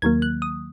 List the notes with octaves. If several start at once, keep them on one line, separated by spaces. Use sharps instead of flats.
D#2 D#3 F#3 A#3 G#6
F#6
D#6